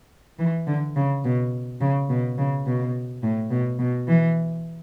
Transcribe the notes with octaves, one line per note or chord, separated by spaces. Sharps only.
E3
D3
C#3
B2
C#3
B2
C#3
B2
A2
B2
B2
E3